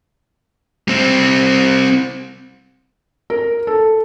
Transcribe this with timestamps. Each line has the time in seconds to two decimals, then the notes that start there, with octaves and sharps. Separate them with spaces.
0.88 G3 C4
3.30 A#4
3.67 A4